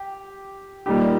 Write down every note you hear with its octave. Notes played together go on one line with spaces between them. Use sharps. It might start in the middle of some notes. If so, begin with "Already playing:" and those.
Already playing: G4
A#2 G3 D#4 G4